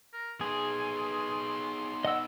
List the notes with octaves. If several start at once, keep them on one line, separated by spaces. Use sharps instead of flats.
A#4
B3 D#4 G#4 C6
D#5 F#5 E6